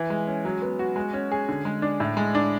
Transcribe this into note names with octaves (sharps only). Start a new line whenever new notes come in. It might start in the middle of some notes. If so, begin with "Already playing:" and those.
Already playing: E3
G#3
C#4
F#3
B3
F#4
G#3
C#4
G#4
D3
G#3
D4
A2
G#3
D4